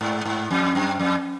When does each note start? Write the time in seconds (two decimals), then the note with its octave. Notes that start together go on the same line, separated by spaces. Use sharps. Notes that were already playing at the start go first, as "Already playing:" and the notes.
0.01 G#2
0.25 G#2
0.51 F2
0.75 F#2
0.99 F2